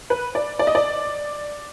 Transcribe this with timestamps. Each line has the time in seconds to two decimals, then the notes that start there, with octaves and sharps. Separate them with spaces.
0.10 B4
0.35 D5
0.59 D5
0.67 D#5
0.75 D5